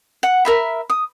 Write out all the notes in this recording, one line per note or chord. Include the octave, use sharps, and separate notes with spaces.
F#5
A#4 E5 B5
D#6